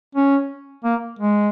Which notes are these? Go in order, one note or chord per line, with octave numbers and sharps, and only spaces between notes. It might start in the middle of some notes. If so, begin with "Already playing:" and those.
C#4
A#3
G#3